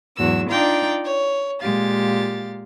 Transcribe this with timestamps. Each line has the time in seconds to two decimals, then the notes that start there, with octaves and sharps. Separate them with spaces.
0.17 E2 G#2 F#3 F#4 E6
0.50 D4 D#4 F4 D5 G5 A#5
1.04 C#5
1.62 A#2 G#3 G4 F5 A6